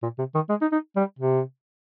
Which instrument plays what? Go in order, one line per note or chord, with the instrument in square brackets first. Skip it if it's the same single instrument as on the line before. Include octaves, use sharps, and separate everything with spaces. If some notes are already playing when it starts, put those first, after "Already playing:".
[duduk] A#2
C3
D#3
G#3
D#4
D#4
G3
C3